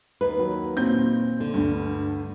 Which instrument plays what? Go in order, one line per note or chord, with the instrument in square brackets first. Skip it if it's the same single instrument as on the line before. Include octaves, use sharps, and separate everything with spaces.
[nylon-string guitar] D#2 B4
[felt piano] F#3
A#2 C4 G6
[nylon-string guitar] D3
[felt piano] D2 G2